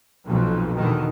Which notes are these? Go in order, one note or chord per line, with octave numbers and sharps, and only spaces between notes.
B1 F2 A#2
E2 B2 D3 D#3